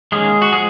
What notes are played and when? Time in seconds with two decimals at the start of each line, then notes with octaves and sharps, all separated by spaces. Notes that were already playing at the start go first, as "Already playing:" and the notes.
0.12 D#3 G#3 A#3 C#4 G#4
0.42 F#4
0.53 F3 G#3 G#4